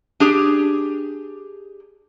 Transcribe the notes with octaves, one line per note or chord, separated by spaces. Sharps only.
D4 G4 G#4